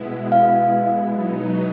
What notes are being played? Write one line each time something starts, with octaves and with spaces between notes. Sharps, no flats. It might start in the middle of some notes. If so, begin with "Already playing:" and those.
Already playing: B2 G#3 B3 E4
F5
B2 F#3 B3 D#4